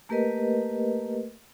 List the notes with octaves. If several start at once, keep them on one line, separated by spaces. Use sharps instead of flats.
A3 A#3 G4 A#4 B4 D#5